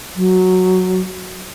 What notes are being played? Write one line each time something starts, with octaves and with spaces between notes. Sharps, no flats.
F#3